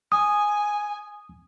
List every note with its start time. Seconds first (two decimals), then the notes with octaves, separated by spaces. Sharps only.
0.12 G#5 D#6